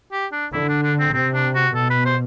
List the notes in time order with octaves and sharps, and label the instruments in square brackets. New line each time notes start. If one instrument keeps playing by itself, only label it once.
[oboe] G4
D4
[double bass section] D3 [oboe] E4
[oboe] D4
D4
C4
[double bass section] C3 [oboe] C4
[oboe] D4
F#4
[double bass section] B2 [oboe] A4
[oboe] B4
C5